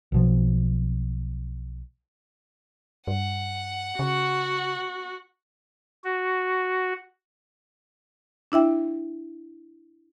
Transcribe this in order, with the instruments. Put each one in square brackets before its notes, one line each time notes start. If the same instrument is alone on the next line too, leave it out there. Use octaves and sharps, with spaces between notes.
[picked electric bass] B1 B2 F3
[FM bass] G2 [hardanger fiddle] F#5
[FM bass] C#3 [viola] F#4
[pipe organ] F#4
[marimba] D4 E4 E5 G5